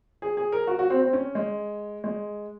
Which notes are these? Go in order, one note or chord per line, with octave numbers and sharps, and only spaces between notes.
G#4
G#4
A#4
F#4
F#4
C4
C4
C#4
G#3
G#3